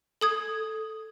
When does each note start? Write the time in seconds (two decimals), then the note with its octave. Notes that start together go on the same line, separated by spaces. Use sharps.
0.21 A4 D#6 G#6